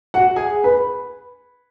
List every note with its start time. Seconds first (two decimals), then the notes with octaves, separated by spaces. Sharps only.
0.14 F#4 F#5
0.36 G#4 G#5
0.64 B4 B5